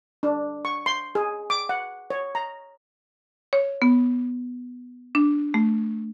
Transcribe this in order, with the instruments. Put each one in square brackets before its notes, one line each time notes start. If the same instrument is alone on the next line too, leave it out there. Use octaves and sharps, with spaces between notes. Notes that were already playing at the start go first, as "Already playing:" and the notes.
[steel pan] D4
C#6
C6
G#4
D6
F#5
C#5
A#5
[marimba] C#5
B3
D4
A3